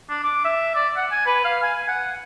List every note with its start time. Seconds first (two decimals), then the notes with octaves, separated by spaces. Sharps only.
0.09 D4
0.24 D6
0.45 E5
0.75 D5
0.97 F#5
1.12 G#5
1.26 B4
1.45 F5
1.63 G#5
1.88 F#5